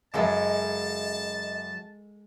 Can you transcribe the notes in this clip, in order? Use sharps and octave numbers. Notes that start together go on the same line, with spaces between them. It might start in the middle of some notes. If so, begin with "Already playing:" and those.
F#2 C#3 G#3 A4 D#5 A5